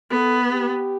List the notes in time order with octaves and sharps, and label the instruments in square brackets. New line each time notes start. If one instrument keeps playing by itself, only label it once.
[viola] B3 [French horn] A4
[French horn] G4